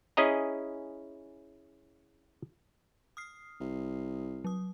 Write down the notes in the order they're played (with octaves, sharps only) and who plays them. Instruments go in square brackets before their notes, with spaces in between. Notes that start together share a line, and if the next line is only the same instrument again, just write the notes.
[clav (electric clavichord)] C#4 E4 G#4 D#5 A#5
[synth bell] D#6 F6 C7
[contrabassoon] C2
[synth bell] F#3 D#6